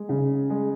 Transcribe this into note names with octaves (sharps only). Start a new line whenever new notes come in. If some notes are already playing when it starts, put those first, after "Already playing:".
Already playing: G#3
C#3
G#3